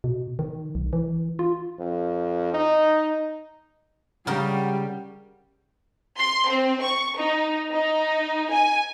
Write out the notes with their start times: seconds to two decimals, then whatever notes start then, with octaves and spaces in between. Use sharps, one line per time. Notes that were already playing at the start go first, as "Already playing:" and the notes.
0.04 B2
0.39 D#3
0.75 B1
0.93 E3
1.39 F4
1.79 F2
2.54 D#4
4.27 C#3 G3 A#4 F#5 G5
6.19 C6
6.47 C4
6.84 C#6
7.17 D#4
7.71 D#4
8.52 G#5